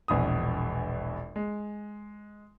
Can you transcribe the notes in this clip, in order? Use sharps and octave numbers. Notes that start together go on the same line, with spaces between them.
E1 A#1 E2 D#6
G#3